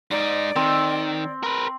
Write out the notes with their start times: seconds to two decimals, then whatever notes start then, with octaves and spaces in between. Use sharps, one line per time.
0.11 G#2 D#4 D5
0.56 D#3 C4
1.43 A#4 B4